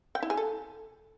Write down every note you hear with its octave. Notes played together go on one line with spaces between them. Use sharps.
G5
E4
G#4
A4